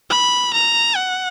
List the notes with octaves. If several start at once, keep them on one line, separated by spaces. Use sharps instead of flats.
B5
A#5
F#5